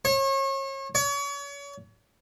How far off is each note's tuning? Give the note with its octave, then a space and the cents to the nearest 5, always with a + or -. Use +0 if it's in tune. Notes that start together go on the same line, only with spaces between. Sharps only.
C#5 -35
C#5 +35